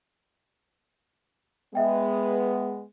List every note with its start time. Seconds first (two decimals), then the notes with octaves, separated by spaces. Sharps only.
1.75 G#3 B3 E5 G5